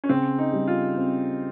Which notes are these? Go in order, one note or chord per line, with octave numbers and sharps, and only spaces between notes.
C#4
C#3 C4
D#4
G3
F4
C4